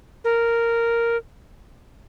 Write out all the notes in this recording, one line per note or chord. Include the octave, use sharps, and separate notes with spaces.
A#4